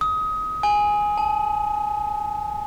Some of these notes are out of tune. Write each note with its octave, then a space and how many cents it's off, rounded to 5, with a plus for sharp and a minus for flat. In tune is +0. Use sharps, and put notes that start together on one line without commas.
D#6 +25
G#5 +0
A5 -40